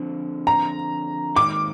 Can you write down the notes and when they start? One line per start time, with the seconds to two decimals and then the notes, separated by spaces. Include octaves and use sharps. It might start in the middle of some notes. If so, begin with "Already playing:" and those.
Already playing: D3 F3 C4
0.47 A#5
1.35 G#2 D#3 A#3 D#4 D6